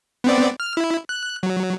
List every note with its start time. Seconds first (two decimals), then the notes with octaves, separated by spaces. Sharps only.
0.24 B3 C4 D5
0.60 F6
0.77 E4
1.09 F#6
1.43 F#3